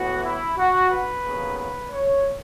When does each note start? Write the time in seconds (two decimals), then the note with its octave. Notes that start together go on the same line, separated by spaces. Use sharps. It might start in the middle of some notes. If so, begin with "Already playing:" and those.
Already playing: A2 E3 B3 F#4
0.24 E4
0.58 F#4
0.90 B4
1.24 D#2 C#3 F#3 B3
1.57 B4
1.91 C#5